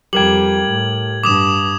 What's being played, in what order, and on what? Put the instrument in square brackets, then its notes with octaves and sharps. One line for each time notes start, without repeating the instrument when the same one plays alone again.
[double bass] F2 G3 [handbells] G4 A#4 G5 [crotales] G#6 F#7
[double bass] A2
[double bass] G2 [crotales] D6 D#6 E7